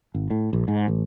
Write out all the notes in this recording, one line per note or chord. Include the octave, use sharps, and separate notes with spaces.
G#1
A2
A#1
G#2
A1